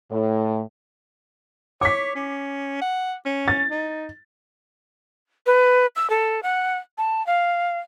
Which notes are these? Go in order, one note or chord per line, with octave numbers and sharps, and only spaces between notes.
A2
C#5 D6 B6
C#4
F#5
C#4
A6
D#4
B4
E6
A4
F#5
A5
F5